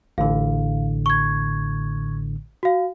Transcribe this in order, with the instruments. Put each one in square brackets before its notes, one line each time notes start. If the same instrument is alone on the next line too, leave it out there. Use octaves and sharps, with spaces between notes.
[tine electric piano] A1 A2 D3 [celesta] F5
[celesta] C#6 G#6
F#4 F5